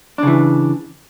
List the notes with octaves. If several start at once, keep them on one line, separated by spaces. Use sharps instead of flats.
C#3 E3 D4